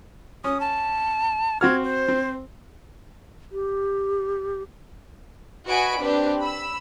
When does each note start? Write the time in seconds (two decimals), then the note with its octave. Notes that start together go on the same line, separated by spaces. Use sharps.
0.44 C#4 D#6
0.60 A5
1.61 C4 F#4 F6 G#6
1.84 C5
2.08 C4
3.52 G4
5.68 F#4 B4 D#5 G#5 B5 D7
5.99 C4 D4 G4 B4
6.40 B5 E6